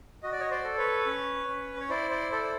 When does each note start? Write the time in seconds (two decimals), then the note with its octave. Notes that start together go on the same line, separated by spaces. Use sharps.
0.23 F#4 D#5
0.32 D5
0.40 C#5 D#5
0.50 C5 D5
0.64 A4
0.78 B4 C#5
1.06 C#4
1.48 C#4
1.80 C#5
1.90 E4 C5 D5
2.10 C5 D5
2.32 A4 C5 D5